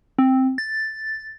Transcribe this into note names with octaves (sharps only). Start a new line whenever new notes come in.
C4
A6